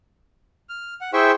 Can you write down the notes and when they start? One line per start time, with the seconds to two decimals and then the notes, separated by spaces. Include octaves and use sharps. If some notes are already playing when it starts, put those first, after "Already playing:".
0.69 F6
1.01 F#5
1.13 E4 G#4 C5 E5 G5 C#6